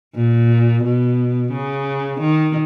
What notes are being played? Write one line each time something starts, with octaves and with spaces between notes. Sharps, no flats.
A#2
B2
C#3
D#3